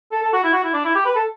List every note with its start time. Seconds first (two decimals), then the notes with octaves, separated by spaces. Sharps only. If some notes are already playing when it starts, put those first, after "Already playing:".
0.12 A4
0.22 A4
0.33 F#4
0.44 E4
0.53 F#4
0.64 E4
0.74 D4
0.85 E4
0.95 G4
1.05 B4
1.16 A4